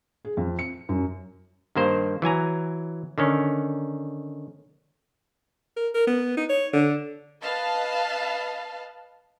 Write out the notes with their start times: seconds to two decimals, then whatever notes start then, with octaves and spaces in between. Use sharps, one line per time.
0.25 G#4
0.37 F2
0.59 C#7
0.89 F#2
1.76 G2 D#3 A#3 C5
2.22 E3 F#3 G#5 A#5
3.18 D3 D#3 C#4
5.77 A#4
5.94 A#4
6.07 B3
6.37 D#4
6.49 C#5
6.73 D3
7.41 B4 D#5 F5 A5